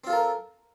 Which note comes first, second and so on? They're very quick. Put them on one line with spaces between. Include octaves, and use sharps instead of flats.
C4 F4 A4 A#4